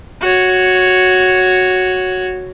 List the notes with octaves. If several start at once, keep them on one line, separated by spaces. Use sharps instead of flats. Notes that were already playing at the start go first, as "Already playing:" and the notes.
F#4 C#5